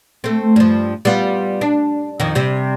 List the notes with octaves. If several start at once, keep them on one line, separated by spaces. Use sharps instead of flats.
A3 C4
G2 F3
G3 B3 F4
D4
F2 D#3
C3 G3